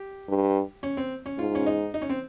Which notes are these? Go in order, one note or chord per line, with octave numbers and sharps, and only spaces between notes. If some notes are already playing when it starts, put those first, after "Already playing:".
Already playing: G4
G2
C#4
C4
C#4
G#2 F4
C#4
D#4
D#4
C#4
C4